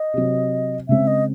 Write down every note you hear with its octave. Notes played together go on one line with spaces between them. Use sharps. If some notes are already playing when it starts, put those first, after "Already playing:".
Already playing: D#5
C3 F#3 C4
C#3 G#3 C4 E5
D#5